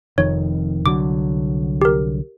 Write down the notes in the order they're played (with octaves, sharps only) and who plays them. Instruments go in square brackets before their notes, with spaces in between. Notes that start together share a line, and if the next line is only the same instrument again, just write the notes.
[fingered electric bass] F1 F2 D#3 [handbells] C#5
[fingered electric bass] C2 D3 F#3 [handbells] D6
[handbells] G4 A#4